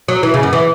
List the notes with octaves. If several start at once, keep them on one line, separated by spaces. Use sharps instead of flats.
F#3
E3
C#3
F#2
E3